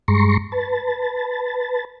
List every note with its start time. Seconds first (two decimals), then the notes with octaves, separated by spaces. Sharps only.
0.08 G2 G#3 A#5 C6 C#6
0.52 B4 A5